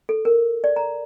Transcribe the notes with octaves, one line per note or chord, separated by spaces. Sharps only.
A4
A#4
D5
A#5